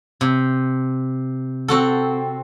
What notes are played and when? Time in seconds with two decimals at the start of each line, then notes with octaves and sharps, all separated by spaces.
0.21 C3
1.68 C4 F#4 A4